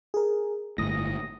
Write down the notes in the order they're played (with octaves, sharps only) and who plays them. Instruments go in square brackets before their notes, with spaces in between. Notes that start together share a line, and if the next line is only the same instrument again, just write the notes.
[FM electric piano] G#4 A#4
[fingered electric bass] G1 A2 [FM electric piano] D#6 A#6